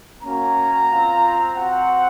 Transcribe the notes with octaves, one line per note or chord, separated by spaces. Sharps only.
A#3 C#4 F#4 A#5
C4 F4
C4 F#4 F#5